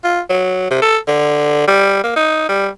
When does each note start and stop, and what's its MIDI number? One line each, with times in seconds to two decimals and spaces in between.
0.04 0.20 65
0.30 0.67 54
0.71 0.79 48
0.82 0.98 69
1.08 1.66 50
1.67 1.99 55
2.04 2.15 58
2.16 2.46 63
2.49 2.68 55